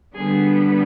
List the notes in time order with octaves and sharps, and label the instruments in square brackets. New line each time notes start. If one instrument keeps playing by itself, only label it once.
[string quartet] D3 G3 B3 D4 G#4